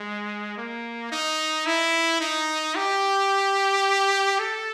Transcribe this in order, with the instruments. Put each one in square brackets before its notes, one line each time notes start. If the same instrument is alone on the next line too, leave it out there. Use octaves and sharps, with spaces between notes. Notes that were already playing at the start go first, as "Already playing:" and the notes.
Already playing: [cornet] G#3
A#3
D#4
E4
D#4
G4
A4